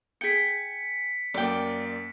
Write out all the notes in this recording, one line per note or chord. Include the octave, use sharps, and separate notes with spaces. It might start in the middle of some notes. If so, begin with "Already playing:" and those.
G#4 G5 B6 C#7
F#2 A#3 D5 G5